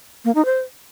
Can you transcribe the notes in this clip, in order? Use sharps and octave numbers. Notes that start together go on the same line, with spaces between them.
A#3
D#4
C5